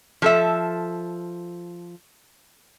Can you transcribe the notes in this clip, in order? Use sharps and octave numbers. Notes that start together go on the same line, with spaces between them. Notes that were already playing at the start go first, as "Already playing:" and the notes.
F3 A4 E5